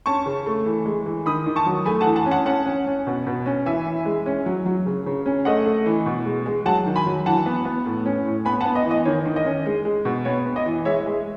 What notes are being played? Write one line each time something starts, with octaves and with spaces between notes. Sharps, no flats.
C#4 A5 C#6
C#3
A3
E3
G#3
E3
D#3 B5 D#6
D#3
A5 C#6
F#3
A3 G#5 B5
F#5 A5
E3
F#5 A5
C#4
F#5 A5
C#4 F#5 A5
C#4
C#4
B2
B2
C#4
E3 E5 G#5
E3
G#3
C#4
F#3
F#3
C#3
C#3
C#4
A3 D#5 F#5
A3
E3
B2
G#3
G#3
F#3 F#5 A5
D#3
G#5 B5
F#3
E3 F#5 A5
B3
B3
A2
C#4
A2
B3 G#5 B5
F#5 A5
B3
D#5
E3 D#5
D#3 C#5
D#3
D#5
C#4
G#3
G#3
B2
B3 C#5
B3
D#5
E3
G#3 C#5 E5
G#3